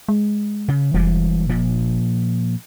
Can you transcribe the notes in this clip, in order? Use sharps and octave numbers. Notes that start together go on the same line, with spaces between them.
G#3
C#3
F1 E3 G3 G#3
A#2 F3